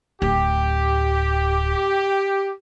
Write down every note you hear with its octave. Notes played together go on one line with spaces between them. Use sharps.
D1 G4